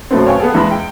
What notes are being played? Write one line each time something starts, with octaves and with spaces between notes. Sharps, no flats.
F#2 B2 A3 B3 C4
C#5 F5 G5 G#5
B3 G#4 A4
E2 G#3 E4 B5
G5